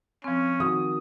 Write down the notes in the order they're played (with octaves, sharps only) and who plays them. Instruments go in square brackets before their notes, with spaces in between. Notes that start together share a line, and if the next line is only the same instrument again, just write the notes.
[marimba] F3 C4 [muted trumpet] C#4
[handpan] D#3 F#4 [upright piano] D#6